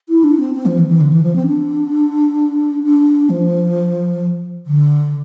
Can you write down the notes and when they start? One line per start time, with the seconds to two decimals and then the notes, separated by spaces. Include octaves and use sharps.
0.09 E4
0.24 D4
0.40 C4
0.55 C4
0.66 F3
0.78 E3
0.89 E3
1.01 D3
1.12 E3
1.23 F3
1.36 C4
1.47 D4
2.84 D4
3.30 F3
4.66 D3